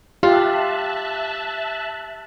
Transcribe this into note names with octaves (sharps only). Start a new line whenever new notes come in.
F4 G4 E5 A5 F#6